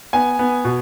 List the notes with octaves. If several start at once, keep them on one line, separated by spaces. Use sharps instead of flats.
B3 G#5
B3
B2